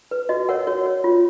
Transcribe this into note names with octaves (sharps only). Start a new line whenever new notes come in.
B4
F#4 D#5
A#4 C#5 F#5
F#4 C#5
C#5
F4